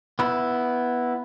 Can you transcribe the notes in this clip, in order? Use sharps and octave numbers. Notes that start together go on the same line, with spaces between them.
B3 E4